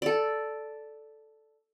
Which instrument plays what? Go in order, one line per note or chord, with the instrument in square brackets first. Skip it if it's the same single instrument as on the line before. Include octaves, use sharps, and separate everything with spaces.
[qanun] A4 D5